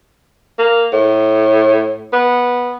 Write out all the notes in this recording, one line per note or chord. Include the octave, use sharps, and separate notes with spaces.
A#3
A2
B3